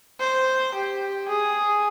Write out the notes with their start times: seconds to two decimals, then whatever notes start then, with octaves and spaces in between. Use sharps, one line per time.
0.20 C5
0.75 G4
1.29 G#4